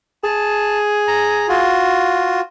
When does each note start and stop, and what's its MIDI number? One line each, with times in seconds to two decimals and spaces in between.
0.24 1.77 68
0.24 0.78 81
1.07 1.47 82
1.49 2.41 65
1.49 2.41 66